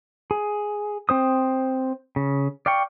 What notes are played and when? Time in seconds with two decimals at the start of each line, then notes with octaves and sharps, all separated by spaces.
0.31 G#4
1.09 C4 C5 D#6
2.16 C#3
2.66 D5 F5 G5 C#6